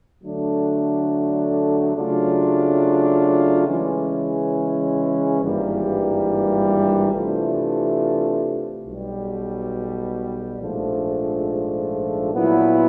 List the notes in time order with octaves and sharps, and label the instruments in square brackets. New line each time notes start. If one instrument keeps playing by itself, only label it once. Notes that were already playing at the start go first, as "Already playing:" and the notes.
[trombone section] D3 F#3 A3 D4
C#3 F#3 A3 D4 F4
C#3 E3 G#3 C#4
G#1 G2 E3 G3 A#3
C3 E3 A3 D4 F4
B1 B2 G3
A#1 G#2 F3 A3 D4
A#2 F#3 B3 E4